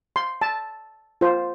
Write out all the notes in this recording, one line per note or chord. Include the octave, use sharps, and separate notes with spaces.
C6
A5
F4 C5